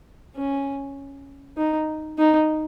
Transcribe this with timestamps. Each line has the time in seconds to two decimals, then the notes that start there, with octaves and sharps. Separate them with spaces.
0.37 C#4
1.57 D#4
2.18 D#4